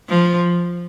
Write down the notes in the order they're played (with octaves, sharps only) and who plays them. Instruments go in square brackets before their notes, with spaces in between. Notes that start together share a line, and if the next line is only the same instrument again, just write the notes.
[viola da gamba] F3